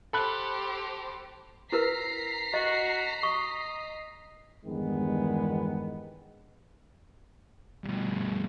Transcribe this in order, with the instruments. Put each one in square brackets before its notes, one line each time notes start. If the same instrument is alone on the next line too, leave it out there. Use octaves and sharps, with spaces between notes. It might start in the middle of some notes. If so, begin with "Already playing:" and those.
[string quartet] G4 C5 [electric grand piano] A4 B5 F#6
[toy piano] E4 A#4 B4 [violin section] A#5 B6 C7
[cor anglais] F#4 [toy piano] D#5
[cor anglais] D#5 [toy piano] C#6
[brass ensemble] E2 G2 D#3 G#3 B3
[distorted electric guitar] G2 B2